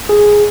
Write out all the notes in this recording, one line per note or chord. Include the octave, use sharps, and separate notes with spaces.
G#4